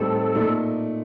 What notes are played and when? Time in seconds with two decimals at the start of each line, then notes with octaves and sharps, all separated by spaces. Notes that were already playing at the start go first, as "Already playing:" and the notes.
Already playing: A2 G3 C4 D#4 A4
0.35 A#2 A3 D#4